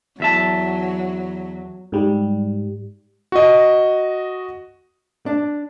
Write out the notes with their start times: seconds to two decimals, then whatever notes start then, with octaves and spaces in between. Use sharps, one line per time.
0.20 E2 F#3 E5 A5
1.92 G#2 G3
3.32 F#4 D#5
5.26 D4